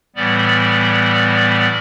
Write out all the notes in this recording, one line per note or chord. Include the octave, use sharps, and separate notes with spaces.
A2 E3 G3 B3 D5